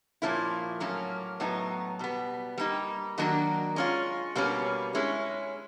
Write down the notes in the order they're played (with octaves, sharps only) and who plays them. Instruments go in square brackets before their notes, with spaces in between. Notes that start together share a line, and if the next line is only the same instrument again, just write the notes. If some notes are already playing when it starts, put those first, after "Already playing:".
[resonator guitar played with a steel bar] A#2 F3 A#3 C#4 E4
A2 F#3 A#3 C#4
A2 F#3 B3 D#4
B2 G3 B3
G3 A#3 D#4
D#3 F#3 A#3 D4 F#4
G#3 C#4 F4
B2 G3 A#3 C#4
G#3 C#4 E4